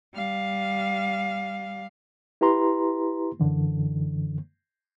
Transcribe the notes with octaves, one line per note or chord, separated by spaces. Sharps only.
G3 F5
E4 G4 B4 A#5 C6
F#2 D3 E3